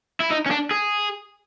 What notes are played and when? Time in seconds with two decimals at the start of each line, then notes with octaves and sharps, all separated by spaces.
0.20 E4
0.31 D#4
0.46 C#4
0.51 D4
0.71 G#4